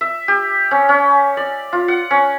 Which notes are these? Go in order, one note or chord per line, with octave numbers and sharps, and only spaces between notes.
E5
G4
C#4
C#4
D5
F4
F#5
C#4